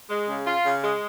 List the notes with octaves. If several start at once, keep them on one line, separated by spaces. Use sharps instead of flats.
G#3
C#3
F4
C#3
G#3